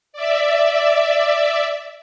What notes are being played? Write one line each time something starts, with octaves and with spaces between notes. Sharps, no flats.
D5 E5